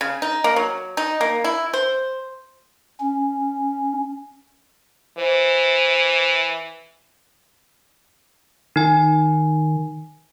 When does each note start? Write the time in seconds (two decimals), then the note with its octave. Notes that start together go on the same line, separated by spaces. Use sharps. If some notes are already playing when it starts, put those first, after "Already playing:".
0.01 C#3
0.22 D#4
0.44 A#3
0.56 F#3
0.97 D#4
1.21 A#3
1.44 E4
1.73 C5
3.00 C#4
5.18 E3 C5
8.76 D#3 D#4 G#5